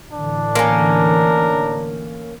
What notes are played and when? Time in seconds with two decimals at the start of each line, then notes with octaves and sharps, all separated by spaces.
0.13 A2 D3 E3 D4
0.55 A#3 C#4 A#4